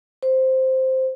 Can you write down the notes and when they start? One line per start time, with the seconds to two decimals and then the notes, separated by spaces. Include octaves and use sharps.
0.23 C5